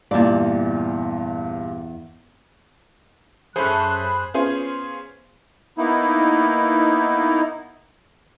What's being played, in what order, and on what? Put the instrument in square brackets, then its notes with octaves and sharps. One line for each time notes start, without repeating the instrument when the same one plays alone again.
[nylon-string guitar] E2 D5 [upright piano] G2 A#2
[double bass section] F#2 [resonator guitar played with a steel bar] A3 C#4 A4 [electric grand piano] G#4 C5 [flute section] B5 F#6
[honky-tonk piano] B3 C#4 F4 G#4 C5
[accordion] A#3 B3 D#4 E4